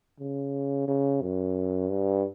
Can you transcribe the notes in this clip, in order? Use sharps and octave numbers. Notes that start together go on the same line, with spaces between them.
C#3
C#3
F#2
G2